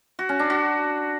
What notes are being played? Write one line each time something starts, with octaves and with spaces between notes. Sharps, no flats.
F#4
C#4
D4
F#4